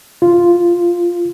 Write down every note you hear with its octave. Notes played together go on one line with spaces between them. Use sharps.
F4